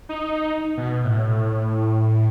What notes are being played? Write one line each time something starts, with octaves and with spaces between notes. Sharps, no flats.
D#4
B2
A2